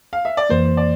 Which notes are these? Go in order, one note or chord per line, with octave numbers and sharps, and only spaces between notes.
F5
E5
D5
F2 E3 A#3 C5
D5